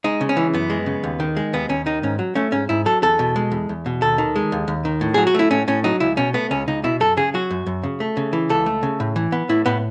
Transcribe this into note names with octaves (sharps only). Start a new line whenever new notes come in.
G#3 D#4
C#3
C#4
E3
F#2 B3
G#3
C#3
D#2
D#3
G#3
D#2 B3
D#2 C#4
D#3 D#4
G#2 C#4
F#3
A3 C#4
G#2 C#4
G#2 E4
F#3 A4
E2 A4
B2
G#3
E2
E2
B2
D#2 A4
D#3
G#3
D#2
D#2
D#3
A2
F#3 G#4
F#4
A3 E4
A2 C#4
A2 C#4
F#3 D#4
C#2 E4
B2 C#4
A3 B3
C#2 C#4
C#2 D#4
B2 E4
F#2 A4
C#3 G#4
F#3 F#4
F#2
F#2
C#3
A3
C#3
E3
C#2 A4
A3
C#3
A2
E3
B3
A2 E4
A2 B3